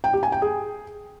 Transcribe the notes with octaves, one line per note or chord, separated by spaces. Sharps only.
G5
G4
G#5
G5
G#4